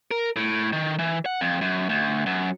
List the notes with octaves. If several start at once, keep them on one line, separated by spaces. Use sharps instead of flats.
A#4
A2
D#3
E3
F#5
F2
F#2
D2
F#2